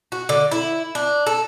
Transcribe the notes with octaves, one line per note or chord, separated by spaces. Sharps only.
F#4
D3
E4
D4
A4